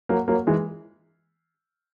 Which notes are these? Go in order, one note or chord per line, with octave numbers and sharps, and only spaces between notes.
F#3 A#3
F#3 A#3
E3 G#3